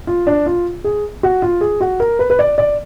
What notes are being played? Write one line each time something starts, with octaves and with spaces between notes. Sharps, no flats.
F4
D4
F4
G#4
F#4
F4
G#4
F#4
A#4
B4
B4
D5
D5